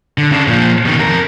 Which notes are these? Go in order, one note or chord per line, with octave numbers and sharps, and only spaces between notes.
D3
C#3 D4
A#2 F3
B2 D#3
F2 A#4